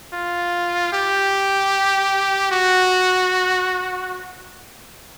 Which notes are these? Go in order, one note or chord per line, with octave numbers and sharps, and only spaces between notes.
F4
G4
F#4